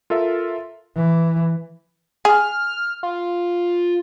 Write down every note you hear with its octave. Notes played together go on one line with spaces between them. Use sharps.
F4 A4 A#4 E5
E3
G#4 F6
F4